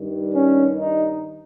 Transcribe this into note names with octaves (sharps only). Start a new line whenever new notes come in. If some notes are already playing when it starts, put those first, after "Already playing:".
Already playing: G2 D#3 G3
C#4
D#4